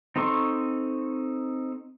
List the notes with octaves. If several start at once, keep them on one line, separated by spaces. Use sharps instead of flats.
C4 D#4 A4 C6 C#6